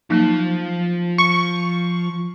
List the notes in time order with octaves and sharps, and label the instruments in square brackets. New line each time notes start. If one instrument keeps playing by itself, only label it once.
[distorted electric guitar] F3 A5 [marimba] F#3 A#3 D#4
[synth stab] C#6